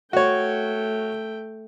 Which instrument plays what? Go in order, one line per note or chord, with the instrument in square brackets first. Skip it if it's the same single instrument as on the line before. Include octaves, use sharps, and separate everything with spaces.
[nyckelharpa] A3 G5 [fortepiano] F#4 C#5